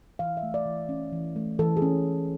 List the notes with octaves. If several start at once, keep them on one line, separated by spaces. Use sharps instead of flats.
E3 F5
E5
A3
D5
E3
C#4
E3
A3
E3 A4
G#4
C#4